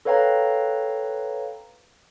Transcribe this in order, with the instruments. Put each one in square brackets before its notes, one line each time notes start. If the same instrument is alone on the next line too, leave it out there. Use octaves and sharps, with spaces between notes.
[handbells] A4 B4 C#5 F5 G5 A#5